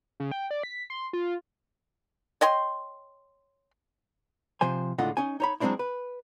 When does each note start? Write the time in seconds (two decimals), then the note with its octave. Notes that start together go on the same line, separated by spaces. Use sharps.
0.20 C#3
0.31 G5
0.51 D5
0.63 B6
0.90 C6
1.13 F4
2.41 C#5 D#5 G5 C6
4.61 C3 F3 C5 G#5
4.98 C#2 A2 D3 F4 D#5 F#5
5.17 C#4 D#4 G#5
5.40 D#4 C#5 B5
5.60 F#3 G#3 A3 C4 D4 E4
5.79 B4